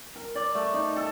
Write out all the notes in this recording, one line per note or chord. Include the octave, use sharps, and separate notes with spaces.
A#4
D5
A3
D#4
A4